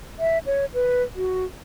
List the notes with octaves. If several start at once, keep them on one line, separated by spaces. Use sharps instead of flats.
E5
C#5
B4
F#4